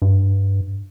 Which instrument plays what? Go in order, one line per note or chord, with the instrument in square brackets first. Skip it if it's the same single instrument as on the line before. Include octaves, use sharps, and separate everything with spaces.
[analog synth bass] G2